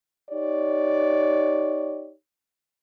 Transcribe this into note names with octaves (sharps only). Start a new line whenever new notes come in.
D#4 G4 C#5 D5